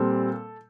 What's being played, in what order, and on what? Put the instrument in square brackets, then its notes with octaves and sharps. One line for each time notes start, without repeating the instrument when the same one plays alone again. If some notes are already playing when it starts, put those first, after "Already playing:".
Already playing: [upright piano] A#2 G3 C4 A4